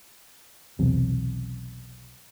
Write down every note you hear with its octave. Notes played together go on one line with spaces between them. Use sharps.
B1 E2 C3